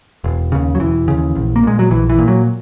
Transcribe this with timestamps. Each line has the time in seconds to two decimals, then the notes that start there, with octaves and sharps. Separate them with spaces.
0.24 E1
0.52 D#2 C#3
0.75 F#3
0.80 E1 E3
1.08 D#2 C#3
1.35 A#1
1.56 A#3
1.63 A#2 G#3
1.79 F#3
1.91 A#1 E3
2.09 E3
2.19 A#2
2.28 F#3